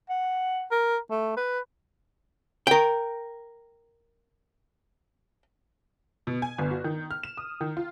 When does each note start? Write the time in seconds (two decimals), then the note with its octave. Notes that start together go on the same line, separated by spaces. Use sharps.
0.09 F#5
0.71 A#4
1.10 A3
1.36 B4
2.67 A#4 G5
6.27 B2
6.42 G#5
6.58 G1
6.71 F#4
6.84 D#3
7.11 F6
7.23 E7
7.37 D#6
7.61 D#3
7.77 F4